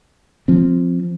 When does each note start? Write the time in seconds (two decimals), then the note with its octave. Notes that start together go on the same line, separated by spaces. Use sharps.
0.48 F3 C4